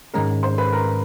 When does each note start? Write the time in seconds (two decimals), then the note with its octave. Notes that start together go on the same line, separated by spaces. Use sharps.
0.14 G#2 D#3 G#3 C#4 A#4 A#5
0.43 C5 C6
0.58 B4 B5
0.72 A#4 A#5